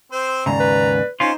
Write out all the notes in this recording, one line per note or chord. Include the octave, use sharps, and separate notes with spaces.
C4 C5
D#2 G#2 C#3 D5 A#5
B4
C#4 D#4 F4 C5